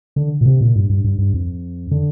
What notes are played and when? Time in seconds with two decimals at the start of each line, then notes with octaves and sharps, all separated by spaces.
0.16 D3
0.41 A#2
0.46 C3
0.61 A#2
0.75 G2
0.89 G2
1.04 G2
1.18 G2
1.34 F2
1.91 D3